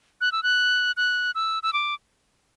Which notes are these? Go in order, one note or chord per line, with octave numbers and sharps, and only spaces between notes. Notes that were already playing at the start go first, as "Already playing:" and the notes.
F#6
E6
F#6
F#6
E6
E6
D6